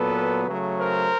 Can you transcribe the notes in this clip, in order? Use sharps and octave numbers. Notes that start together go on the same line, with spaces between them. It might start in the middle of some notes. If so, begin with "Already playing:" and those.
Already playing: A#2 F#3 B3 A4 B4
C#3 F#3 A3
A#4 C5